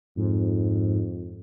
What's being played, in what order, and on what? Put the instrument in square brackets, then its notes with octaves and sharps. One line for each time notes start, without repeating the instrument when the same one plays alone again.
[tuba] F2 [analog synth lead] G#2